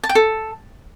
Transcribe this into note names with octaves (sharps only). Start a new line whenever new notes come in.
A5
G5
A4